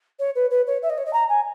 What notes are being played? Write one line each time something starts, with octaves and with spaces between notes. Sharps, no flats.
C#5
B4
B4
C#5
E5
D#5
C#5
D#5
A#5
G#5